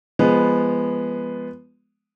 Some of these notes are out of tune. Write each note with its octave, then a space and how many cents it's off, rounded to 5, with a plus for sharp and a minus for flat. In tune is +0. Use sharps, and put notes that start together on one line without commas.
F3 -15 G#3 +0 B3 +0